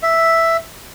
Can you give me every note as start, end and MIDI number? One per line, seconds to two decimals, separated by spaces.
0.03 0.57 76